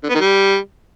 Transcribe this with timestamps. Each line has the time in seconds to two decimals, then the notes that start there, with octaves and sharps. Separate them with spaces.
0.03 D3
0.09 B3
0.15 D#3
0.21 G3